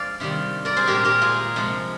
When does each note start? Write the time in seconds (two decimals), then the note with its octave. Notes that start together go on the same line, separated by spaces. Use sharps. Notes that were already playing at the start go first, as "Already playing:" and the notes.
Already playing: F3 G#3 D5 F5
0.20 C3 D#3 G3
0.65 A#4 D5
0.76 G#4 C5
0.87 A#2 G#3 G4 A#4
1.05 G4 A#4
1.22 F4 G#4
1.56 C3 F3 G#3